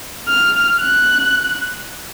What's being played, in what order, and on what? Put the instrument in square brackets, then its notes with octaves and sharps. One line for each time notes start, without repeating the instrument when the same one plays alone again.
[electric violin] F6
F#6